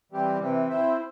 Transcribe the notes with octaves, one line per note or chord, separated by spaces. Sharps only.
E3 G3 C4 G4
C3 E3 C4
C4 E4 C5 E5